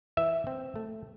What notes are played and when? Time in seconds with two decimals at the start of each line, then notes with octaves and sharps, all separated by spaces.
0.17 E3 E5
0.47 C4
0.76 A3